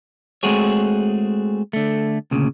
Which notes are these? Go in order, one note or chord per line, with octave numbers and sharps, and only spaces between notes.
G#3 A3 C4 F#4 G#4 C#5
D3 A3
D2 A#2 C#3